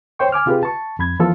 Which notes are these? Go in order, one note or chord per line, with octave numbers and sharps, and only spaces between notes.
C5 C#5 G5 C#6
G#5 D6 F6
C3 F4 G4 G#4 B4
A5 C#6
F2 B5 G#6
E3 F3 B3 F4 A4